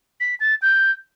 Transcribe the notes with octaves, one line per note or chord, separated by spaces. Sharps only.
B6
A6
G6